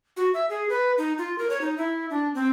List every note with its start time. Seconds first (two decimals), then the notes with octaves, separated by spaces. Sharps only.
0.17 F#4
0.34 E5
0.50 G#4
0.69 B4
0.98 D#4
1.18 F4
1.38 A#4
1.50 C#5
1.61 D#4
1.78 E4
2.10 D4
2.35 C4